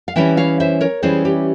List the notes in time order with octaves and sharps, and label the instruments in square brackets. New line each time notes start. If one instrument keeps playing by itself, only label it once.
[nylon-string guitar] F5
E3 G3 C#4 E4 E5 G5
C#5 F5
C5 E5
A#4 C#5
E3 G3 C#4 E4 G#4 C5
G4